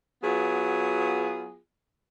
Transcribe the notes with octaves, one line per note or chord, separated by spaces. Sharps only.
F#3 B3 F4 G#4